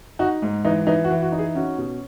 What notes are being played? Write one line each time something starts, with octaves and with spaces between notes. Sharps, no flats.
D#4 F#4
G#2
E3 D#4
E3 D#4
F#4
E3
F#4
D#4
G#4
C#4 F#4
B2